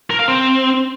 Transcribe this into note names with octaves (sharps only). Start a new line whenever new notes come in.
A#4
F5
C4